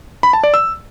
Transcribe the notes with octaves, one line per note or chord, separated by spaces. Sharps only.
B5
A5
D5
E6